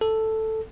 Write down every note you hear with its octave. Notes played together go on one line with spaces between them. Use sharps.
A4